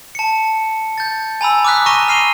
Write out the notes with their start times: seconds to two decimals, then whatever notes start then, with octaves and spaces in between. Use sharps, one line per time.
0.15 A5 C#7
0.98 G6 A6
1.41 G#5 A#5 B5 E6
1.65 D6 D#6 F6 F#6 B6
1.86 A#5 C#6 F#6 A#6 D#7 G7
2.08 F6 C7 D#7 F7 G7